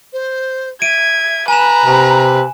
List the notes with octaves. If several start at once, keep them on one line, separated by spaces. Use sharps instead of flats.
C5
E5 G#6 D7 D#7
B4 G#5 A#5 E7
C3